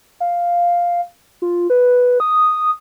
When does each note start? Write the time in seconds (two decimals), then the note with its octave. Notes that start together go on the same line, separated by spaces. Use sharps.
0.20 F5
1.42 F4
1.70 B4
2.20 D#6